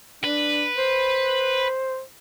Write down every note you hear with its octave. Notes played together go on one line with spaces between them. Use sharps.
D4 B4
C5